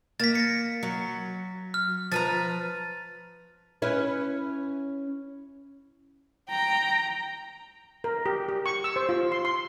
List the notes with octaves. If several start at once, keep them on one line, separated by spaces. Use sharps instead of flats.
A#3 A6 B6
A#6 C#7
F#3
F6
F3 B4 A#5 A6 D#7
C#4 E4 B4
G5 A#5
A#4
G4
G4
C#6
E6
C5
F4
C6
C6